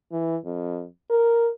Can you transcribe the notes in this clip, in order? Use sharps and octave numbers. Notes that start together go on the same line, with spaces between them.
E3
F2
A#4